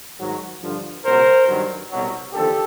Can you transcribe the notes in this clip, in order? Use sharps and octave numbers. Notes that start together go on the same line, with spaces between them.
G#2 D#3 F#3
G2 D3 F3
C#2 B2 F#3 A#4 C5
G2 D#3 F#3
C2 B2 F#3
D#2 D3 F3 G4 A4